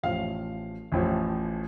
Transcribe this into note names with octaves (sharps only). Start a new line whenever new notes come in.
A1 A2 F3 F5
A1 A2 F3